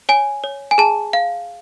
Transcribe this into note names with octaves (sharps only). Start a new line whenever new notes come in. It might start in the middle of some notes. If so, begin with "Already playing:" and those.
C#5 G#5
C#5
G#5
G#4 A5
F5